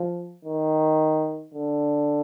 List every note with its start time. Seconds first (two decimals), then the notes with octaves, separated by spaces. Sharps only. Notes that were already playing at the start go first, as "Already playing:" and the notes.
Already playing: F3
0.45 D#3
1.54 D3